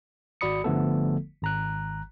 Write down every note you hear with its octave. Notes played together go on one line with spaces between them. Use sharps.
G#1 F#4 D5 B5 D#6 C#7
G1 D3 F3 A3 B3 A4
G#1 A#5 F#6